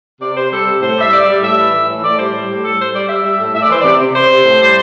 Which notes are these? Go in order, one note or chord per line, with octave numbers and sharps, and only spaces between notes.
C3 D5
C3 C5
G3 A4
C3
A2 C5
G3 E5
G3 D5
G3
A2 E5
E3
E3
A2
A2 D5
G3 C5
G3
A2
G3 A4
G3 C5
G3 D5
G3 E5
G3 E5
A2
A2 E5
D5
E3 C5
C3 D5
C3
C3 C5
C3
A2
G3